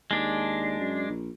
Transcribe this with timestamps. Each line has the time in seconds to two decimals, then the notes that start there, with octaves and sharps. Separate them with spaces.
0.11 D#2 G#3 D4
0.80 F#2
1.09 A#1